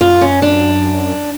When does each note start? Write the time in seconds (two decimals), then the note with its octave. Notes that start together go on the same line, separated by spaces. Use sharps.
0.01 F#2 F4
0.21 C#4
0.42 D4